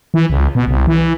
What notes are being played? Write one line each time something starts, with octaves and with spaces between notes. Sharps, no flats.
E3
C#2
B2
C2
E3